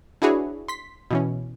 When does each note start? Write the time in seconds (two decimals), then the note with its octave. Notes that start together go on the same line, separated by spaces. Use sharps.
0.22 D4 E4 F#4 G#4 B4 C#5
0.68 C6 B6
1.11 B2 E3 C#4